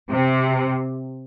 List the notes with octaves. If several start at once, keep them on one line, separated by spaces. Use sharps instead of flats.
C3